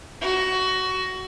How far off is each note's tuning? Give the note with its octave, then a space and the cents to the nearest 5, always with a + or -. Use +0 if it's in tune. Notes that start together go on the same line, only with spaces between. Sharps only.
F#4 +15